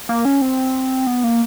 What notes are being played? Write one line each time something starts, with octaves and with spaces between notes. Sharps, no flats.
A#3
C#4
C4
B3
A#3